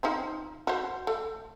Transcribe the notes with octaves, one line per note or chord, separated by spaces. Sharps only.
F3 C4 D#4
F#4 C5
A3